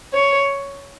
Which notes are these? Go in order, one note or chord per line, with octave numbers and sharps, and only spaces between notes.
C#5